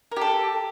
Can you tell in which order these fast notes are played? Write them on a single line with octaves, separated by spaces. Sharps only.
A#4 G4 A4